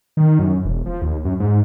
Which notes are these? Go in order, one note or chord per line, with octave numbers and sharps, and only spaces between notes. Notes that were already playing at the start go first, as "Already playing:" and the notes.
D#3
F#2
E1
F3
D#2
F#2
G#2